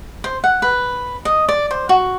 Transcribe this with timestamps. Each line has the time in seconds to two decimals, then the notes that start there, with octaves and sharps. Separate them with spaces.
0.24 C5
0.44 F#5
0.62 B4
1.25 D#5
1.49 D5
1.71 C5
1.89 F#4